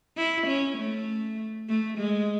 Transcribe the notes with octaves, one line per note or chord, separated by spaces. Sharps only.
E4
C#4
A3
A3
G#3